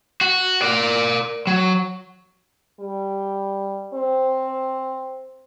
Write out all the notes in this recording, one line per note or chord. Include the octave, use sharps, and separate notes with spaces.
F#4
A#4 D5
F#3
G3
C4